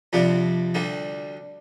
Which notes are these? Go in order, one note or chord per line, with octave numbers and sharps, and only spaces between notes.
F2 C3 G3 D4
D2 D3 G3